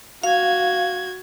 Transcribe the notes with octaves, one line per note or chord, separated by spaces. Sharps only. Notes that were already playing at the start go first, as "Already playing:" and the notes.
F#4 F5 G#6